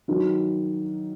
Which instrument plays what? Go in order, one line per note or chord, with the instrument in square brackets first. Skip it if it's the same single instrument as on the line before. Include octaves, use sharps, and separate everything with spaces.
[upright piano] D#3 F#3